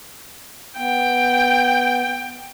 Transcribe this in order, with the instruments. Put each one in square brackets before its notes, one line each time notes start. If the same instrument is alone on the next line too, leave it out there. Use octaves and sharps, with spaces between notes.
[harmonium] B3 [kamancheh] G5